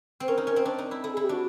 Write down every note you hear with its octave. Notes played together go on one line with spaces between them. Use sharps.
C4
C#4 A#4
D#4
C#4
C4
D4
D#4
E4
E4 A4
G#4
E4
G4
D4 F#4